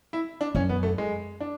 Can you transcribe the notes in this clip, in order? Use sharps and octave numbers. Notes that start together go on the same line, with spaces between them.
E4
D4
F#2 C#4
B3
A3
G#3
D4